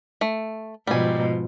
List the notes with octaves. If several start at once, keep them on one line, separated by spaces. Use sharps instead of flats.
A3
G#2 B2 F3 G3 G#5